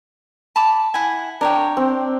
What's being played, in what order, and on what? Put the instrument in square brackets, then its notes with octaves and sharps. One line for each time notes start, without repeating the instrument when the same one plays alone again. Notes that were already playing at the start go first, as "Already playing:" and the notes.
[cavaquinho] A5 B5 D6
E4 F#5 G#5
[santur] D4 [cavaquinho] A#4 C#5 G5
[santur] C4